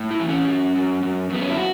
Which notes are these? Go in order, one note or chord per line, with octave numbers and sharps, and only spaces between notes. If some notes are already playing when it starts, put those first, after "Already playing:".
Already playing: A2
E4
E3
C#4
F#2
F#2
F#2
F#2 B3
C#4
E4
F#4